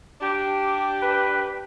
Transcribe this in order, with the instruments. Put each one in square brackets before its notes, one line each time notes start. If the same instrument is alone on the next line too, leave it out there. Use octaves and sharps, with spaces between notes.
[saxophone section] D4 G4
[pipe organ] B4